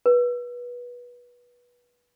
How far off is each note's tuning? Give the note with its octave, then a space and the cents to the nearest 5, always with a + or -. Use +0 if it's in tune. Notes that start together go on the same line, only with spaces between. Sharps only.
B4 -25